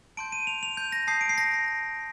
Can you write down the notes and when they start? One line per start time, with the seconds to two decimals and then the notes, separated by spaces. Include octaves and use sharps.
0.17 A5 C6 G6 D7
0.32 D#7
0.47 F7
0.63 F7
0.77 G6
0.92 A#6
1.07 A5 D#6 G6 C7
1.21 D7
1.29 C7
1.38 A#6